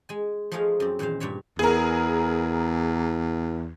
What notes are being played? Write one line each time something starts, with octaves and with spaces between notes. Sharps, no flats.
G#3 G#5
F3 G#3 A3 D#4 G#4 F5
F#2 C4
E2 A#2 D#3 C5 F5
G2 A#2 C#5 E5
E2 G#4 A#4